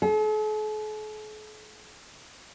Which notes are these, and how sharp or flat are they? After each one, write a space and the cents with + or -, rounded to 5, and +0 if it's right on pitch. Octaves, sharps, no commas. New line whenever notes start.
A4 -45